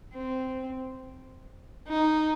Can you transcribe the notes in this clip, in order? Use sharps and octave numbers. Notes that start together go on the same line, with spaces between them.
C4
D#4